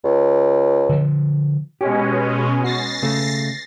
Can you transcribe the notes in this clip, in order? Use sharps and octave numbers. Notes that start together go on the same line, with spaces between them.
C#2
D3 F3
B2 G#3 C#4 G4
F#4 A6 A#6 C7
C#3 A3